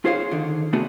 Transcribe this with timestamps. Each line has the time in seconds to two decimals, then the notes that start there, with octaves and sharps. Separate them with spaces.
0.05 F4 G#4 C5 C#5 D#5 F5
0.31 D3 D#3
0.73 C3 A3 B3 D4 F#4 G#4